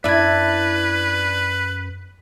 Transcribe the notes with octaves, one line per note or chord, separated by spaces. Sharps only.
F#2 D4 E4 B4 D5 G#6